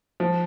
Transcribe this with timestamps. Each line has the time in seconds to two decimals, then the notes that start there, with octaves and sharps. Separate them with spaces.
0.20 F3